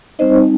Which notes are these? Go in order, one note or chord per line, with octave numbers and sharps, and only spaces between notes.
G3 C4 D#4 C5 D#5